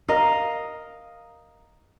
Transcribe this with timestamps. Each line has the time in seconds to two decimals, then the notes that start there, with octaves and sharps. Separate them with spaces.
0.08 A#4 D#5 F5